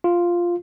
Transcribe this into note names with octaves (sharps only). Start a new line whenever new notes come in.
F4